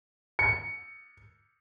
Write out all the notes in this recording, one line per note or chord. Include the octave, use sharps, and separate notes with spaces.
C#7